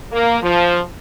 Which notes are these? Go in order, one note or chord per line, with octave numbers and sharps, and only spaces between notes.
A#3
F3